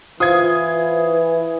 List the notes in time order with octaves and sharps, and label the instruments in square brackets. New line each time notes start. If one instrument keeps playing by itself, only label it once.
[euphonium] E3 [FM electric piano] F4 C5 F5 [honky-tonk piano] D#6 G#6